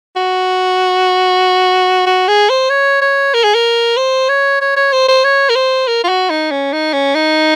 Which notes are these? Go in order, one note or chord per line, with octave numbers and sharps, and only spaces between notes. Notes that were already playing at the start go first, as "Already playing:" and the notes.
F#4
F#4
G#4
C5
C#5
C#5
A#4
G#4
A#4
C5
C#5
C#5
C#5
C5
C5
C#5
A#4
C5
A#4
F4
F#4
D#4
C#4
D#4
C#4
D#4